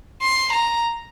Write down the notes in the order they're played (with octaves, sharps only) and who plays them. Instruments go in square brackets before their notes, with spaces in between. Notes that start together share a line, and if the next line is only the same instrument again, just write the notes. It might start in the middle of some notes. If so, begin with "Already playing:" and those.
[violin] C6
A#5